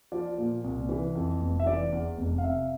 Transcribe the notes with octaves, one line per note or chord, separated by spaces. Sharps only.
F3 D5
A#2
C2
E3
F2
F1
E5
E3 D5
E2
F1
F5
C3 E5